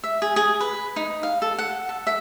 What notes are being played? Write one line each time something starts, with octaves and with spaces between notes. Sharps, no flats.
E5
G#4
G#4
B4
D#4
F5
A4
F#5
A4
E5